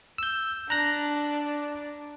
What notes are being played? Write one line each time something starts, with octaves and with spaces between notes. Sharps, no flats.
E6 G6
D4 A#5 F#6 A#6